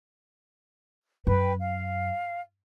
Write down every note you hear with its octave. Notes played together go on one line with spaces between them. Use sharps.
F#2 B4 G5
F5